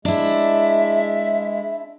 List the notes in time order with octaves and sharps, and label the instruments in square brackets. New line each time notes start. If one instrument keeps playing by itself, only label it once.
[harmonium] G#3 [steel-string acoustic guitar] D4 E4 [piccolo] E5